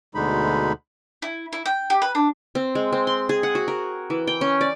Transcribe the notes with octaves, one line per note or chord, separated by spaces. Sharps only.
D2 B2 D3 G#3 D#4 B5
E4
E4
G5
G4
B4
D4
C4
G#3
C4
C6
G#4
F#5
F#4
A#4
E3
G5
C#4
D5